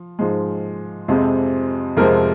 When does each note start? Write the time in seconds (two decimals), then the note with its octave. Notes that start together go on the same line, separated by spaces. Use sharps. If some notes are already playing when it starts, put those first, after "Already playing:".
Already playing: F3
0.19 G#2 F3 G#3
1.08 F2 C3 F3 G#3 C4
1.97 F2 C3 F3 G#3 C4 A#4